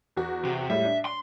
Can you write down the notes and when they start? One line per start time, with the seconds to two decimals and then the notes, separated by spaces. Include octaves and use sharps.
0.17 E2 F#4
0.45 C3
0.70 A2 G3 G#3 E5
0.85 D4
1.05 C6